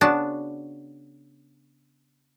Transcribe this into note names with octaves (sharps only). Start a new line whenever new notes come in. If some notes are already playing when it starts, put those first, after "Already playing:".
C#3 B3 D4 F#4 A5